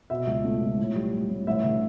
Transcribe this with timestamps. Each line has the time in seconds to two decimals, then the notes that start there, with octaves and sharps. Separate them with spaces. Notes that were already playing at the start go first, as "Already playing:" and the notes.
0.10 B2 E5
0.27 C#2
0.45 A3
0.61 C#2
0.78 A2
0.95 G3
1.12 G3
1.29 A2
1.47 A1 E5
1.64 D3